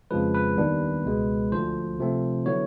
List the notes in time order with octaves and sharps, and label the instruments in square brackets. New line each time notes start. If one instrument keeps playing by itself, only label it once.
[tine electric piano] F2 C#3 F3 G#3 B4
B4
D#2 D#3 G3 B3 D4
C#2 B2 G#3
D2 D3 F3 C5
C3 F3 A3 C4
D3 F#3 B3 E4 C#5